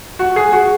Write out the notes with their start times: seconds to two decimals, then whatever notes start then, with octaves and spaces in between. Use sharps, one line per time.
0.19 F#4
0.36 G#4
0.52 F#4